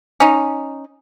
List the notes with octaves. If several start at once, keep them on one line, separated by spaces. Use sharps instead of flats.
C#4 D#4